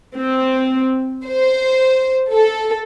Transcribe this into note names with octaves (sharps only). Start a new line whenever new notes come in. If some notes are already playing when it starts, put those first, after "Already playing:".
C4
C5
A4